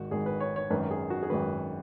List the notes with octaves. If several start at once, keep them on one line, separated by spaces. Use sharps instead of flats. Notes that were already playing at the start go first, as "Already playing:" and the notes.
Already playing: G#1 G#2 D#3 F#4
G#1 G#2 D#3 G#4
B4
C#5
C#5
G#1 F#2 D#3 B4
G#4
F#4
G#4
G#1 F#2 D#3 B4